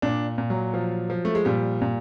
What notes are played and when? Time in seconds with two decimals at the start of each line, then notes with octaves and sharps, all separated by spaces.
0.02 A#2 D4
0.38 A#2
0.50 F#3
0.74 F3
1.10 F3
1.25 A3
1.35 G#3
1.45 A#2 G3
1.82 A#2